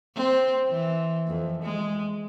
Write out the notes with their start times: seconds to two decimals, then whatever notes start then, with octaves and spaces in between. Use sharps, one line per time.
0.15 C4
0.69 E3
1.27 F2
1.63 G#3